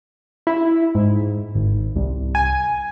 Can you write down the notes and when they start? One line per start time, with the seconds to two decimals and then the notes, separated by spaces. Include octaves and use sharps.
0.47 E4
0.95 G#2
1.55 G#1
1.96 C2
2.35 G#5